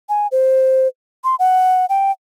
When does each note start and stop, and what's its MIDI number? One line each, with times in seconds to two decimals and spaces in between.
0.09 0.27 80
0.32 0.88 72
1.24 1.35 84
1.39 1.86 78
1.89 2.11 79